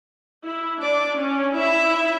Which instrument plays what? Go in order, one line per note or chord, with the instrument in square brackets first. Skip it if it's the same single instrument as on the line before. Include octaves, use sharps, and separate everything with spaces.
[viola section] E4
[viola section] D4 [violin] D5
[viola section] C#4
[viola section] E4 [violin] E5